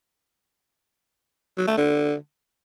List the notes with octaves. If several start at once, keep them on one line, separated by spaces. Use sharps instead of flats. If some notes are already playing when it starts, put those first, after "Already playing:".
F#3
A3
D3